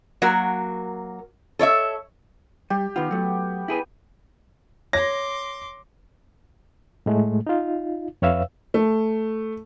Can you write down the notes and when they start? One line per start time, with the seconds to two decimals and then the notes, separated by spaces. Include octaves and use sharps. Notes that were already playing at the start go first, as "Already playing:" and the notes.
0.22 F#3 A#3 F#4 A#4
1.59 A4 C#5 D5 E5
2.70 G3 G4
2.96 D#3 B3 F4
3.11 F#3 A3
3.68 E4 G#4 B4
4.93 C#5 C6 D6 A#6
7.06 A2 G#3 A3
7.47 D#4 F4
8.22 F2 B4 C#5 E5 F5 E6
8.74 A3